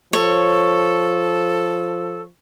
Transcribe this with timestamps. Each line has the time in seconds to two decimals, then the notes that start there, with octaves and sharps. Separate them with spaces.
0.13 F3 A4 C#5